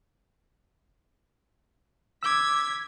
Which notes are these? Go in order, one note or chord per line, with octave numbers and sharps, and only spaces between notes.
D6 E6 G#6 B6